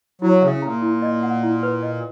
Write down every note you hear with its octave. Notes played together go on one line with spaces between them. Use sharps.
F#3 E4
C#3 E5
A#2 A#5
E4
D#5
F#5
E4
B4
D#5